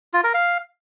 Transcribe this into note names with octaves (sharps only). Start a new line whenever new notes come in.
F4
A#4
F5